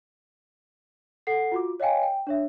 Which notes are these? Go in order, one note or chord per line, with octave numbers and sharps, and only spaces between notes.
A4 F#5 C7
F4 F#4 D6
C#5 D#5 F5 G5 G#5
G5
D4 C#5 E5